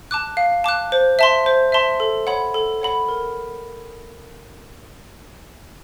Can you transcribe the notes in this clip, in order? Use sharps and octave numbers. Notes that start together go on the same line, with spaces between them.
A5 D6 F#6
F5
A5 D6 F#6
C5
E5 A5 C6
C5
E5 A5 C6
A4
C#5 F#5 B5
A4
C#5 F#5 B5
A#4